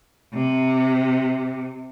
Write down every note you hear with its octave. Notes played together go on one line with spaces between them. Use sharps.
C3